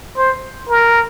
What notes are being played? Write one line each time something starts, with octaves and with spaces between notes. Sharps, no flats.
C5
A#4